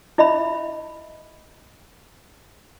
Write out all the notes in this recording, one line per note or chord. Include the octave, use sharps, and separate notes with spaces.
E4 D#5 E5 B5